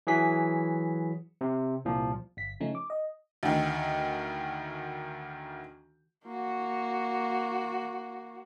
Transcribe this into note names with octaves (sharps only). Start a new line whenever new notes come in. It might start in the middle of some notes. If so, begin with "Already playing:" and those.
E3 F#3 G#4 B6
C3
C2 A#2 F3
G1 B6
C#3 F3 A3 C#4 D#4
D6
D#5
D2 D#3
A#3 F#4